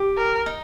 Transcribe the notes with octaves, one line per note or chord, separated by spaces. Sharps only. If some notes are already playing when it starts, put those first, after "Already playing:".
Already playing: G4
A#4
D#4